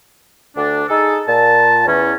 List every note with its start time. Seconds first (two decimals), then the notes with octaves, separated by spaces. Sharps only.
0.57 D2 D4
0.89 D#4 G#4 A4
1.27 A#2 A5
1.87 E2 E3 C#4